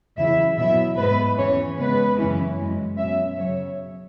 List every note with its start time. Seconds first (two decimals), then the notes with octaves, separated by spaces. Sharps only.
0.18 E2 C#3 F#3 E4 E5
0.58 B2 F#3 E4 E5
0.97 G#2 G#3 B3 B4
1.38 E2 E3 C#4 C#5
1.78 C#3 G#3 B3 B4
2.19 F#2 C#3 E3 C#4 E4
2.58 F#2 E3 G#3
2.98 B2 F#3 C#4 E5
3.37 F#2 C#3 F#3 C#5